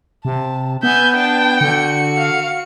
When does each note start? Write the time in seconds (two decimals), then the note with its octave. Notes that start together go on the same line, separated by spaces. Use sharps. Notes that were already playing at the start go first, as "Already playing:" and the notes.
0.25 C3 A5
0.83 B3 E5 G#5 G6
1.16 D4 G5 A5
1.61 D3 F#4 C#7
2.17 F5